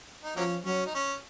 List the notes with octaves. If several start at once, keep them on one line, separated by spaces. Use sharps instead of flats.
D#4
F3 F#3 A#3 C#4
F#3 C#4
D#4
C#4